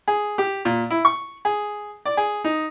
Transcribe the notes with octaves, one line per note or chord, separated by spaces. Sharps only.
G#4
G4
A#2
E4
C#6
G#4
D5
G#4
D#4